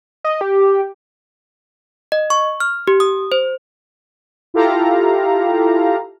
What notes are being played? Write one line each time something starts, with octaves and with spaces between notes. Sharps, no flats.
D#5
G4
D#5
C#6
F6
G4
D#6
C5
E4 F4 G4 A4 F5 A#5